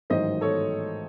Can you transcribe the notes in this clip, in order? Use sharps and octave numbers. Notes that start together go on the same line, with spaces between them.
A1 G#2 D#3 F#3 C5 D#5
A4 C#5